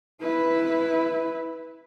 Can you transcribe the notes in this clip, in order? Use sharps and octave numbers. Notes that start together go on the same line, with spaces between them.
E4 B4